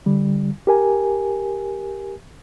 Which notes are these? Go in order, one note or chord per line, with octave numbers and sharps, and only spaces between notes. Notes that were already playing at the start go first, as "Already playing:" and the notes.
D3 G3
G4 A#4 G#5